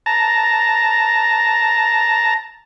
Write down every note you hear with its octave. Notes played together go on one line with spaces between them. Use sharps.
A5 A#5